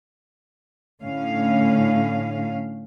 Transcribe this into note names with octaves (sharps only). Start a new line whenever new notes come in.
A2 D3 C#4 F5